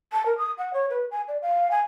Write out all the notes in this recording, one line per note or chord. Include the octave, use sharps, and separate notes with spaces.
A5
A#4
D#6
F#5
C#5
B4
G#5
D5
F5
G#5